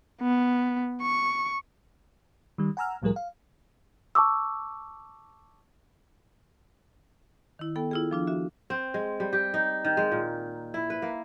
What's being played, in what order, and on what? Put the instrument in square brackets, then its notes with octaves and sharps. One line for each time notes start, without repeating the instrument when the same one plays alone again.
[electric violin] B3
C#6
[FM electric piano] D#3 G3
F#5 G#5 A#5 E6 F6
C2 A2 F3 G3 G#4 A#4
F5
[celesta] A5 C#6 D6 E6
[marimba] D#3 E4
B3 A4 G5
E4 F4 G#4
F3 D4 F4
F#4 E5
[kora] C4
G#3
G3
G4
D#4
D#3
G#3
A#2
E4
B4
A#3